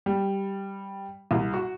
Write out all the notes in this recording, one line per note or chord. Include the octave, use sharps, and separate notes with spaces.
G3
C2
F#4